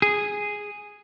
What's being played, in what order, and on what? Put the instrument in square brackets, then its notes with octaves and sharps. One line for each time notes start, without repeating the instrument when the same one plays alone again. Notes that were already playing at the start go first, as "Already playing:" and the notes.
[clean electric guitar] G#4